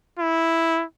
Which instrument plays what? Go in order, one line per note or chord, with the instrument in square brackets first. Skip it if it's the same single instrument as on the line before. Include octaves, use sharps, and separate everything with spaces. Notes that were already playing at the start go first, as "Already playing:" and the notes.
[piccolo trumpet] E4